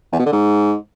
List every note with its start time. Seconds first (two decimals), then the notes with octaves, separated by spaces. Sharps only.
0.12 E2
0.19 B2
0.26 D3
0.33 G#2